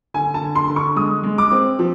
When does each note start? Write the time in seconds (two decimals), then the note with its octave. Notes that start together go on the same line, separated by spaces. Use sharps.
0.14 D3 G#5
0.34 A5
0.41 D3
0.56 C6
0.70 D3
0.76 C#6
0.96 G#3 D#6
1.23 G#3
1.38 D6
1.52 C4
1.79 F3